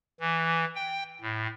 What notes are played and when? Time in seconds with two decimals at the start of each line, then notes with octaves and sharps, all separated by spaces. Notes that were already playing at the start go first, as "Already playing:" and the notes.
0.20 E3
0.75 G5
1.21 A2